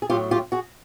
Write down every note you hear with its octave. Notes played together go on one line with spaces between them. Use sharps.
G#4
A2 F#3 F4 G4
F4 G4
F#4 G#4